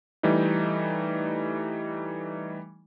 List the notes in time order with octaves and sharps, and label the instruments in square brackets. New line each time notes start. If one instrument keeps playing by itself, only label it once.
[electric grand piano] E3 G3 A3 D#4